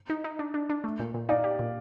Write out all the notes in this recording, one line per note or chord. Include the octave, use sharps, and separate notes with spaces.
D#4
D#4
D4
D4
D4
A3
A#2
A#2
D#4 D5 F5
G4
A#2